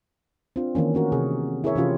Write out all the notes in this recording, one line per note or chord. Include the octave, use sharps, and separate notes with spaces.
C4 D4 F4
D#3 E3 A#3 C#4
A3 C#4 F#4 A#4
C3 G#4
E4 G#4 A#4 C#5 E5
C3 E3 C#4 F4 G4